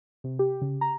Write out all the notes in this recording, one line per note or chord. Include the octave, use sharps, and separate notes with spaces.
C3
G4
C#3
A#5